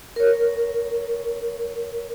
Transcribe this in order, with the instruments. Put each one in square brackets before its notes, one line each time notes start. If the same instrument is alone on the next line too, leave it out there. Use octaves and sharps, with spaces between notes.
[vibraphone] A#4 C#5